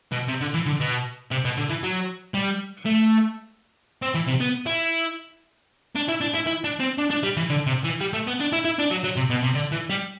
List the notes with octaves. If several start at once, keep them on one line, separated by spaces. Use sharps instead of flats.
B2
C3
D3
E3
D3
B2
C3
B2
D3
E3
F#3
G3
A3
C4
E3
C3
B3
E4
D4
E4
D4
E4
E4
D4
C4
D4
D4
G3
E3
D3
C3
E3
G3
A3
B3
D4
E4
E4
D4
F#3
F#3
C3
B2
C3
D3
E3
G3